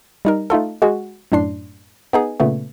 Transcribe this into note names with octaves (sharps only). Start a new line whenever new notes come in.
G3 D#4 A#4
A3 D#4 F4 A4
G#3 F#4 G#4
F#2 A2 D4 C6
B3 D#4 G#4
A#2 C#3 A3 B3